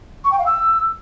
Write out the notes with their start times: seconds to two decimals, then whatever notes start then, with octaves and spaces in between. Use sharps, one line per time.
0.24 C#6
0.32 G5
0.39 F5
0.46 E6